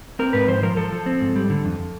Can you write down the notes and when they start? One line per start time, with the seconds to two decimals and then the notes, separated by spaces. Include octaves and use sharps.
0.19 C4 A#4
0.33 G#2 B4
0.48 F3 C5
0.63 F3 A#4
0.77 F3 A4
0.92 F3
1.06 C4
1.21 G#2
1.36 G3
1.50 D3
1.65 F2